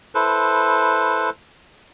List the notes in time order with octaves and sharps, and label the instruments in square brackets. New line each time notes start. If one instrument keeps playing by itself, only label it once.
[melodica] E4 A4 B4 C5